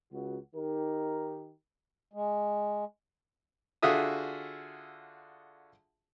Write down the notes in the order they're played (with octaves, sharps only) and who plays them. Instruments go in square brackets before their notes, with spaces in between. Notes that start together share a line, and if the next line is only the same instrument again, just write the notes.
[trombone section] C#2 F#4
D#3 D#4 G4 A#4
[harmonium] G#3
[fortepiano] D3 F4 F#4 G#4 E5 D#6